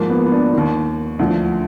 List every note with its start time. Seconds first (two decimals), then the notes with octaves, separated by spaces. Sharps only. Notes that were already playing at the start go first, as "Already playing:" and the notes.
Already playing: G#2 F3 A#3
0.10 B3
0.26 B3
0.32 D4
0.53 D#2 D#3
1.19 D2 D3 F3